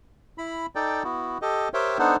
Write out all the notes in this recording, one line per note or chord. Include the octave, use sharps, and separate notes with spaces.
E4 B5
D#4 A4 D5 G5
B3 E4 F#4
G4 A4 D#5
G4 A#4 C5 C#5 E5 G5
B3 D4 D#4 A4 C5 F#5